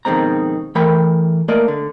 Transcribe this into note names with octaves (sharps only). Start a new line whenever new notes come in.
F2 B2 D#3 G#3 C4 A#5
E3 A3 A#4 G5 B5
A3 A#3 A#4 D5 D#5
D3